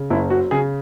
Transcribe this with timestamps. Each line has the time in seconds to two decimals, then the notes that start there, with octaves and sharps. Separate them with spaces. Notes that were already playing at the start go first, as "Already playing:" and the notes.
Already playing: C#3
0.10 F#1 E4
0.30 F#3 F#4
0.51 C#3 G#4